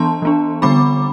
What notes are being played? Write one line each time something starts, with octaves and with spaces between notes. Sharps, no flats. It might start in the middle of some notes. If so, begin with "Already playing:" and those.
Already playing: E3 B3 D4 A5 C6
E3 B3 D4
D3 G3 B3 D4 B5 D6